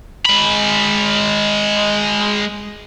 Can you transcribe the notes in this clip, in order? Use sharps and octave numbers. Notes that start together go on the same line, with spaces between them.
G#3 B5